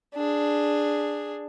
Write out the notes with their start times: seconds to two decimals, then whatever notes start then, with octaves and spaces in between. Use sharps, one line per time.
0.14 D4 G#4